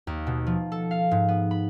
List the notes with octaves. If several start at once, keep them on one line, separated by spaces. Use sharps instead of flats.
D#2
B2
F3
A4
F5
G#2
B3
B5